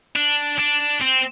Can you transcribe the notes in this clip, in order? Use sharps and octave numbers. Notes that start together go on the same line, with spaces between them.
D4
D4
C4